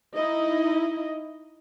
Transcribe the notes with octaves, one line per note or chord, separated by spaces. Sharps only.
D#4 E4 D#5